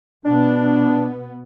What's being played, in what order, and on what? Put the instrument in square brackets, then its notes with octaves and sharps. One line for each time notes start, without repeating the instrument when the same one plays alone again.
[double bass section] B2 B3 [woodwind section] D4